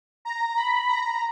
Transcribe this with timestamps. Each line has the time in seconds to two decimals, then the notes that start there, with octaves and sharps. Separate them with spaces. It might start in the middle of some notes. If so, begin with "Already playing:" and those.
0.25 A#5
0.57 B5
0.88 A#5